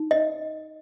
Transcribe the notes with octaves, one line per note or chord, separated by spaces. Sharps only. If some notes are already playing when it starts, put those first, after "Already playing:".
Already playing: D#4
D#5